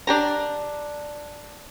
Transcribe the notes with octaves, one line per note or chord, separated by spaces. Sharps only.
D4 G4 A#5